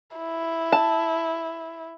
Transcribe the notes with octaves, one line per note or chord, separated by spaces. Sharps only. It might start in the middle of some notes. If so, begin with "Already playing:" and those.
E4
A5